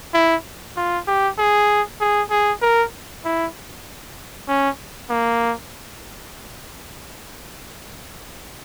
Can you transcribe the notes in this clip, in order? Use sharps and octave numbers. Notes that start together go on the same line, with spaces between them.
E4
F4
G4
G#4
G#4
G#4
A#4
E4
C#4
A#3